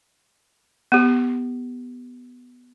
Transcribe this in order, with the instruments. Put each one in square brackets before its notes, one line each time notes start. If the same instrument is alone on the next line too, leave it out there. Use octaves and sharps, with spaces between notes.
[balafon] B3 G4